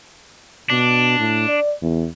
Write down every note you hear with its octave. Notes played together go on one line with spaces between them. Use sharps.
B2 D4
A2
D5
E2